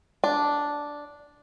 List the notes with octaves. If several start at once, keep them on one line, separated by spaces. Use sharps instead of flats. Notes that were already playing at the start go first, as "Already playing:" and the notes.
D4